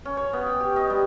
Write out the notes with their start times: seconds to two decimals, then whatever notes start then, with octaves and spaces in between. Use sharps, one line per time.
0.05 C#4
0.17 C#5
0.33 B3
0.46 G5
0.60 G4
0.76 D#4
0.90 G3